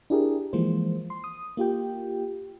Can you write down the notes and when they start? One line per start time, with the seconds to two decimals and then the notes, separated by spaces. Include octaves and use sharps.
0.10 D4 E4 G4 G#4 A#4
0.53 E3 F3 G#3 A#3 C5
1.10 C6
1.24 D#6
1.57 A#3 F4 G4 G5